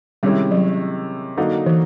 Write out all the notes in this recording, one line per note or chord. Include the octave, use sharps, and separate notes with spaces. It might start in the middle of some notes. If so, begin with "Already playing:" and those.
C3 D#3 G3 G#3 C#4 E4
F#3
D3 F#3 A#3 D#4 F#4
E3